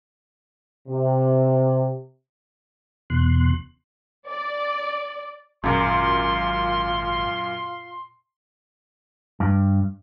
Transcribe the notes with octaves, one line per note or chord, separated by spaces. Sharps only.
C3
E2 B2 C6 F#6
D5
G#1 F#2 A#2 F4 C6
G2